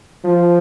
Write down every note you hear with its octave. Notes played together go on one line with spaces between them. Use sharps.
F3